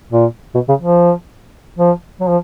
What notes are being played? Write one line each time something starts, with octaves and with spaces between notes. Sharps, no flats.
A#2
B2
C#3
F3
F3
F#3
F3